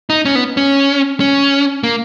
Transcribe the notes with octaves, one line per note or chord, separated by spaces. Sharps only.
D#4
C#4
B3
C#4
C#4
A#3